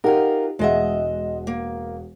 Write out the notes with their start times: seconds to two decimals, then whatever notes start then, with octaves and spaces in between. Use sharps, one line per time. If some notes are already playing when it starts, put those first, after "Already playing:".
0.04 D#4 F4 G4 A#4 F#5
0.59 E1 G#3 G#4 D#5 E5 F#5
1.47 A#3